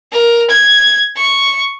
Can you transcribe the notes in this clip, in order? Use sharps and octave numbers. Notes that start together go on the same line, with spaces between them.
A#4
G#6
C#6